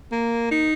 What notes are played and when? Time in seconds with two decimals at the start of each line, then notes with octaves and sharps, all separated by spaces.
0.12 A#3
0.51 D#4